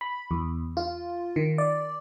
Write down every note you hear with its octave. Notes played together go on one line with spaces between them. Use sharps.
B5
E2
F4
D#3
D5